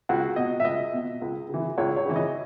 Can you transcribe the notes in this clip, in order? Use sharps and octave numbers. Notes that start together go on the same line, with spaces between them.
C#2 F#4
B2 D#5
E5
C#2 D#5
B2
C#2
C#3 E3
C#2 C#5
C#5
C#3 E3
D#5